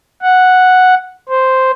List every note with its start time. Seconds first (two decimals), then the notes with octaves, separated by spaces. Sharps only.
0.22 F#5
1.29 C5